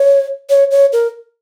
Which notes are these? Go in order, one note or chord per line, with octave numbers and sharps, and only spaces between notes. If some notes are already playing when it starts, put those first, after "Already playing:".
Already playing: C#5
C#5
C#5
A#4